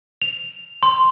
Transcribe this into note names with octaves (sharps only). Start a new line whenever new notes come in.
F7
C6